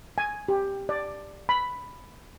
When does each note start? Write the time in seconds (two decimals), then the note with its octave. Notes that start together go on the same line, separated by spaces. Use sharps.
0.18 G#5
0.49 G4
0.89 D5
1.49 B5